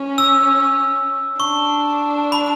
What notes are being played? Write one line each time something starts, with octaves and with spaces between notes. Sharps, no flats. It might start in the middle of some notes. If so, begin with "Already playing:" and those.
Already playing: C#4
E6
D4 C#6
B5